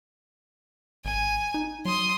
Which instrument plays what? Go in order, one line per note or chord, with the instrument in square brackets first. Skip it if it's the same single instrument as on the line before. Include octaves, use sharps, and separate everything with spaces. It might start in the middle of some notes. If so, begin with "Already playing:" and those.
[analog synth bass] G#1 [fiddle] G#5
[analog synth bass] D#4
[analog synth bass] F#3 [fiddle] C6 D#6